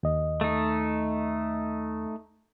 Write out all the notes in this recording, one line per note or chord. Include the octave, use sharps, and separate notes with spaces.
D#2 D#5
A3 D#4